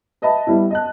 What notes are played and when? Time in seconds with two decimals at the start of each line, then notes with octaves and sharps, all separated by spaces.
0.22 B4 D#5 E5 A5 B5
0.47 G3 B3 E4
0.70 D#5 A5 F#6